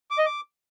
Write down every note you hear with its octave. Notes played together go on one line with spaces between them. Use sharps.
D6
D#5
D6